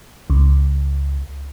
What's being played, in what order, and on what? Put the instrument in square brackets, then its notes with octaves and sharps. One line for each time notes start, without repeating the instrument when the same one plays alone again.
[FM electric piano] C#2